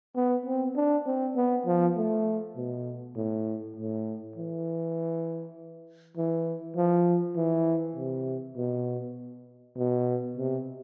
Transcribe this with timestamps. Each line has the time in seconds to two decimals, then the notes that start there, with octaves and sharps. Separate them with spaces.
0.16 B3
0.46 C4
0.76 D4
1.06 C4
1.36 B3
1.66 F3
1.97 A3
2.56 B2
3.16 A2
3.77 A2
4.36 E3
6.17 E3
6.77 F3
7.36 E3
7.96 C3
8.57 B2
9.77 B2
10.37 C3